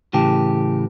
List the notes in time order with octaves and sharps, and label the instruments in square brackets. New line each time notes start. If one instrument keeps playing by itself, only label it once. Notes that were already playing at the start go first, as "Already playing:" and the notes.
[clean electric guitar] A2 C#3 E3 G4 A5